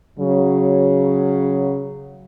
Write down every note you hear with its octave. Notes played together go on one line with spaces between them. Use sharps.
C#3 F#3